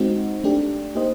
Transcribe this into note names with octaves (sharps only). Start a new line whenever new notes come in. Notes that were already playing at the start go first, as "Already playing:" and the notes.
Already playing: G#3 C4 D#4 F#4
A3 D4 G4
A#3 D#4 G4 C5 D#5